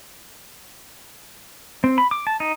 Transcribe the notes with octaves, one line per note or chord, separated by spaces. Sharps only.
C4
B5
D6
A5
D#4